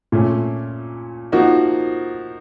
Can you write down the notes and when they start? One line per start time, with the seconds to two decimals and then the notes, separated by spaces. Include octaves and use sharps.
0.12 A#2 A3 C#4
1.32 F3 A#3 D#4 F#4